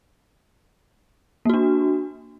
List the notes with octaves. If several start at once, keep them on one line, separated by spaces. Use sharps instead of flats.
A#3 D4 F#4